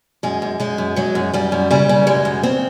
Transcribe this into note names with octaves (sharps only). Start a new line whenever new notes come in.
F#2 G#3
F#2
F#2 G#3
F#2
F#3 G#3
F#2
F#2 G3
F#2
C#3 G3
C#3
F#2 G#3
F#2
C#3 C4